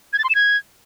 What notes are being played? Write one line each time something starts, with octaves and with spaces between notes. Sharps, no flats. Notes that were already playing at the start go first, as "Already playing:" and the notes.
G#6
A6
C6
E7
G#6